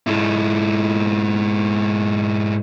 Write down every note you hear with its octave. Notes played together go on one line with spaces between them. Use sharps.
G#2 E4